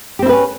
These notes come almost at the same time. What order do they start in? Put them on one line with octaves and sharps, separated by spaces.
G4 C4 E4 B4 C#4